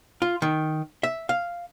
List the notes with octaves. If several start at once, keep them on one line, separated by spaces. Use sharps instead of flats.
F4
D#3
E5
F5